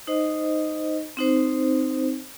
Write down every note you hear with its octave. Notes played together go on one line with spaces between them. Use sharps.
D#4 C5 D#5
C4 D#4 C5